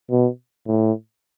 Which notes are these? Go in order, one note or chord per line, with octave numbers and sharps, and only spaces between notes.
B2
A2